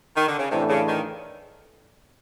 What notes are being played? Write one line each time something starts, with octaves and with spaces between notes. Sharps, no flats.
D#3
D3
C#3
A2 C3 E3 A3 D4
C#3
D#3